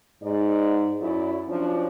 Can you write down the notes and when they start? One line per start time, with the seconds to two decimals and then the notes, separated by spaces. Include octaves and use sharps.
0.22 G#2 D5
0.99 F#2 E4 D5
1.47 F3 F#3 C#4 D4